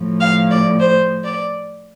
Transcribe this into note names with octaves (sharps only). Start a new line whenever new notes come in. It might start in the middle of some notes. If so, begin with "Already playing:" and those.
Already playing: A2 F3
F5
D5
C5
D5